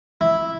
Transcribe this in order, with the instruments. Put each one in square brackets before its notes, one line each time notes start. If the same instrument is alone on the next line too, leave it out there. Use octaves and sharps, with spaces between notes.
[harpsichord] E4